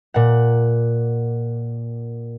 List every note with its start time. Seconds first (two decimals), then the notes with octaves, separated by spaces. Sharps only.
0.14 A#2 F#5